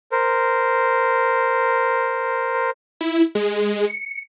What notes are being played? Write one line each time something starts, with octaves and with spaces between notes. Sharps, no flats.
A#4 C5
E4
G#3
C#7